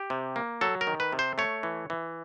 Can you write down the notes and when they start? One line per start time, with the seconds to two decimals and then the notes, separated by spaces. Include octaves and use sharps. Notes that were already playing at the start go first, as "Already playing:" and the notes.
Already playing: G4
0.10 C3
0.36 A#3
0.61 F#3 A4
0.81 A#4
0.87 D#3
1.00 B4
1.12 C3
1.19 C5
1.38 A3 C#5
1.63 E3
1.90 E3